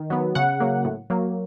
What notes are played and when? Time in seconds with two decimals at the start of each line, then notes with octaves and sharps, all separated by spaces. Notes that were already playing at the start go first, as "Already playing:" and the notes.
Already playing: D#3
0.10 F#3 B3
0.35 C#3 F#5
0.60 F#3 A#3
0.85 A2
1.10 F#3 A#3